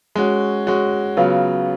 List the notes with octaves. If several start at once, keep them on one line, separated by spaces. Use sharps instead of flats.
G#3 C#4 F#4
G#3 C#4 F#4
C#3 F#3 B3 F4